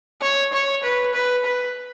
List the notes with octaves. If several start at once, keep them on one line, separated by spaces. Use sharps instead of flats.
C#5
C#5
B4
B4
B4